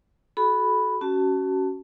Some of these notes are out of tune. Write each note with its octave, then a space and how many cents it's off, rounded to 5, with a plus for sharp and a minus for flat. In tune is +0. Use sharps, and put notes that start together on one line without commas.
F#4 +0 A4 -35 B5 +0
C#4 +0 F#4 +25 A5 +10